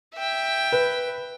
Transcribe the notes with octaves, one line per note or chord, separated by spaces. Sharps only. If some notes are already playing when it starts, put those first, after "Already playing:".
E5 G5
B4